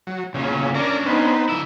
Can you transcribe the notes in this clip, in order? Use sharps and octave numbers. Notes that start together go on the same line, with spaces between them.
F#3
E2 A#2 C#3
C#4 D4 A#4 D5
B3 C4 D#4
D3 E4